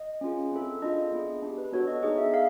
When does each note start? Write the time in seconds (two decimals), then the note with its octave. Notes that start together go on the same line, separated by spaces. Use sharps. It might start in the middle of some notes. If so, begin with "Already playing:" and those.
Already playing: D#5
0.21 C#4 F4 G#4
0.52 C4 E4 A4
0.82 D4 F4 G#4 D#5
1.12 B3 E4 G#4
1.43 D4 G4
1.58 B4
1.72 B3 D4 F#4 A4 C#5
1.87 D#5
2.03 B3 D#4 G#4 D#5
2.18 E5
2.33 G#4 F5